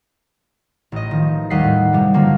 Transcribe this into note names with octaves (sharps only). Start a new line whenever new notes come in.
A1 D#5
D#3 F3
D#2 G3 D#5 F#5 B6 C7
A2
G2 C3 G3
D3 F3 F#3 A#3 D4